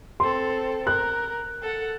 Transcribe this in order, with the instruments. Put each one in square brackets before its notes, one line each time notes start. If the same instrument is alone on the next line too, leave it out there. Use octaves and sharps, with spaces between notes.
[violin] C4 A4 [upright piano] C6
[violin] A#4 [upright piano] F#6
[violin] A4 F#5